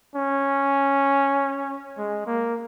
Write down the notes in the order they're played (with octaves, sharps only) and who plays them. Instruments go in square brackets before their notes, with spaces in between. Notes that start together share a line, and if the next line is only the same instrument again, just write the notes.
[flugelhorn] C#4
G#3
A#3